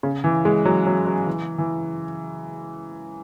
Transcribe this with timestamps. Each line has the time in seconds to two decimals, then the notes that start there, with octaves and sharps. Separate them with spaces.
0.03 C#3
0.24 E3
0.45 G#3
0.65 F#3
0.86 F#3
1.07 F#3
1.27 E3
1.58 E3